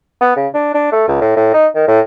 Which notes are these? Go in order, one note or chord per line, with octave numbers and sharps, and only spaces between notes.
B3
C#3
D4
D4
A3
C#2
A2
A2
D#4
D#3
A2